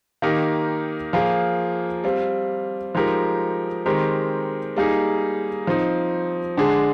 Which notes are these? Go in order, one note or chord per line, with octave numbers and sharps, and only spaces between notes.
D#3 A#3 D#4 G4 A#4
F3 A#3 F4 G#4
G3 C4 F4
F3 G#3 D#4 G4 A#4
D#3 G#3 C4 G4 A#4
G3 A#3 D#4 G#4
F3 C4 D#4
D3 G#3 D4 G#4